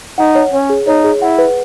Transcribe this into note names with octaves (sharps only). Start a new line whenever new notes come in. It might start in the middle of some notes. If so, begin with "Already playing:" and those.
D#4 F#5
C#5
C#4 C#5
G#4
D#4 C#5
G#4
E4 F#5
B4